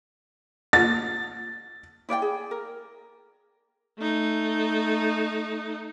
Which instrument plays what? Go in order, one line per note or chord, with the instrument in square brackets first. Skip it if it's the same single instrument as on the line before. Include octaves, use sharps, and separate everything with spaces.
[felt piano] A6
[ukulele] E4 D5 F5 G5
G#4
A#4
[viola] A3 D#4